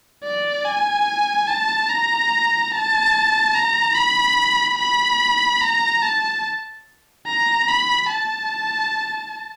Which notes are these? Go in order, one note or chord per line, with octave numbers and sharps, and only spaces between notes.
D5
G#5
A5
A#5
A5
A#5
B5
B5
A#5
A5
A#5
B5
A5